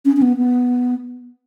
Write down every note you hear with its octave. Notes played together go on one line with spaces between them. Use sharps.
C#4
C#4
B3
B3